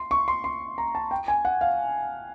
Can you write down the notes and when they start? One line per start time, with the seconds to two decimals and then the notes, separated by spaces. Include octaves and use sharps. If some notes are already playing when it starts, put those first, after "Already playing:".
Already playing: C6
0.11 C#6
0.28 C6
0.44 C6
0.78 A#5
0.95 A5
1.11 G5
1.28 G#5
1.45 F#5
1.61 F5